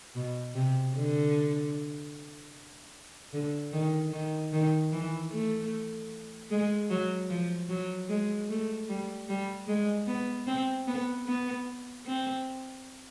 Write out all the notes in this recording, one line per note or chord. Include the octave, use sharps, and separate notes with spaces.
B2
C3
D3
D3
D#3
D#3
D#3
E3
A3
G#3
F#3
F3
F#3
G#3
A3
G3
G3
G#3
B3
C4
B3
B3
C4